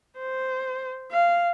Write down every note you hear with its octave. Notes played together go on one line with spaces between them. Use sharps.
C5
F5